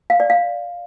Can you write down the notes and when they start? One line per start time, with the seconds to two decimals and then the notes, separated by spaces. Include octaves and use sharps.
0.10 F5
0.20 D5
0.30 F5